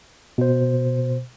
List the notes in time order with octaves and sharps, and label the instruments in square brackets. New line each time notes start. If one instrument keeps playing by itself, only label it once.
[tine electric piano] B2 C5